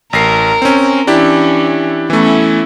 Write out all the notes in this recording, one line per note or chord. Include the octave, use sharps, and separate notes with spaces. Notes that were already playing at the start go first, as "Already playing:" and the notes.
A1 A#4 A#6 C7
C4 C#4
E3 C#4 D4 E4 G4
E3 A3 B3 C#4 E4